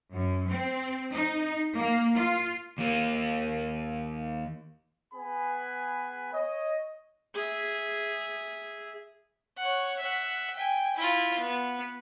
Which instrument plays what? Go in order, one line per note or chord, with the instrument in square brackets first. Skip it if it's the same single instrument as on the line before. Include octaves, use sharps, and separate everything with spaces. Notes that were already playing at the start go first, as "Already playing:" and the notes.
[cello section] F#2
C4
D#4
A#3
F4
[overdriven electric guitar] D#2 A#3
[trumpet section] B3 G#4 B4 G#5 B5
C#5 D#5
[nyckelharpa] G#4 E5
[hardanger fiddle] C#5 F#5
E5 F#5
G5 G#5
E4 F4
B3